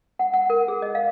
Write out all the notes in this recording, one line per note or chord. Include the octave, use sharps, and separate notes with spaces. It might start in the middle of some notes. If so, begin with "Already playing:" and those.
F#5
F#5
A#4
G#4
D#5
F5